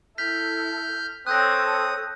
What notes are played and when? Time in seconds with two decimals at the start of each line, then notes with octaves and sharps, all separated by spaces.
0.18 E4 A4 F6 G6 B6
1.27 C4 A4 C#5 D#6 F#6 G6 A#6